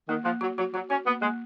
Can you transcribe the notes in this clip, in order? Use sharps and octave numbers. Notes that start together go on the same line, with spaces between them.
D#3 A#3
F3 A#3
F#3 F#4
F#3 F#4
F#3 F#4
C#4 F#4
A#3 B3
G#3 A#3